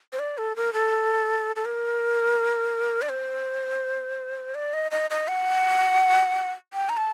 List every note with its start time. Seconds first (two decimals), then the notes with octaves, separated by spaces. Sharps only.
0.13 C5
0.19 D5
0.38 A4
0.56 A#4
0.73 A4
1.56 A4
1.65 A#4
3.02 D5
3.09 C5
4.55 D5
4.73 D#5
4.91 D#5
5.10 D#5
5.28 F#5
6.73 G5
6.89 A#5
6.97 A5